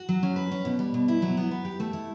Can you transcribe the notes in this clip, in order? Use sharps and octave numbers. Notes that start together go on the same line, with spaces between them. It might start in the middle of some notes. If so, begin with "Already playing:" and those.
Already playing: F#4
F#3
C#4
B4
C#4
B2
G3
B2
E4
F#3
B3
B4
G4
A3
E4